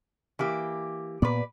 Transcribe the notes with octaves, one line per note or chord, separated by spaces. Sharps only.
E3 A#3 G4
A#2 B3 B4 D5